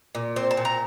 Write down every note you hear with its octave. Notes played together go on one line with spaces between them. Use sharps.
A#2
C4 C5
A5
A#2
A#5